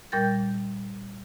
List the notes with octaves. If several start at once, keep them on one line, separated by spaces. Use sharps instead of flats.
A#2 G3 A#4 G5 G6 A6